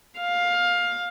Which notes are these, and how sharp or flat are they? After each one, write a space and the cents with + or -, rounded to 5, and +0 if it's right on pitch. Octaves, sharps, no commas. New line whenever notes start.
F5 +15